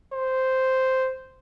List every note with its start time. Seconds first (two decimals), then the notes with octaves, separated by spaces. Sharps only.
0.13 C5